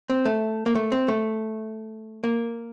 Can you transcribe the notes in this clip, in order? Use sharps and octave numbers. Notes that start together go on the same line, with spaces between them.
C4
A3
A#3
A3
C4
A3
A#3